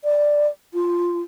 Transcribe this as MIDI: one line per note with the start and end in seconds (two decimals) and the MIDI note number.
0.04 0.47 74
0.74 1.21 65